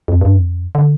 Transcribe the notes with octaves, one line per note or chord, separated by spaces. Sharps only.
F2
G2
F2
D3